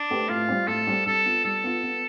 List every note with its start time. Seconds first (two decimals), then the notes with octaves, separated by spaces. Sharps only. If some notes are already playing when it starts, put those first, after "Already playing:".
Already playing: D4
0.10 A3 C4 G4 B4
0.29 A2 F4
0.48 G3 C4
0.67 A2 A4
0.87 G3 C4
1.06 G3 A4
1.25 B3 F4
1.45 G3 A4
1.64 B3 F4
1.83 B3